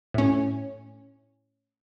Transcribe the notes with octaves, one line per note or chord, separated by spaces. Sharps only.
A2 C#4